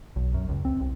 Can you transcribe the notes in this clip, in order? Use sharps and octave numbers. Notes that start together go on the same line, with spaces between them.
B1
F#2
C#2
C4
C2